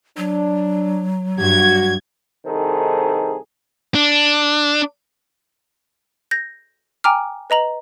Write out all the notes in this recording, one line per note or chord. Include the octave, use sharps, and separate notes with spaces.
F#3 D4
G2 F#4 G#6
C2 D#3 D#4 G#4 A4 C5
D4
G6 A#6
G5 G#5 A#5 D6 F6
B4 D#5 A#5 F#7